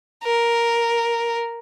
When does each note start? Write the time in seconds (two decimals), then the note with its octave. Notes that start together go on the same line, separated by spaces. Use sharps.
0.24 A#4